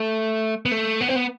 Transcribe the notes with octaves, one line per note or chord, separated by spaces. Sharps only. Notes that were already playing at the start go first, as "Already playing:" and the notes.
Already playing: A3
B3
A3
B3
C4
B3